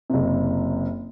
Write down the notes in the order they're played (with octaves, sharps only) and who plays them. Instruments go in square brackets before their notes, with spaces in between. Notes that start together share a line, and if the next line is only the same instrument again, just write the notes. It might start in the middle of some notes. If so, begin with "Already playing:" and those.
[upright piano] F#1 C3